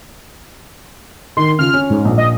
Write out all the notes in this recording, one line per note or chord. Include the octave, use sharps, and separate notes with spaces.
D#3 C6
C#3 F4 F6
C#4
G#2
A#1
D#5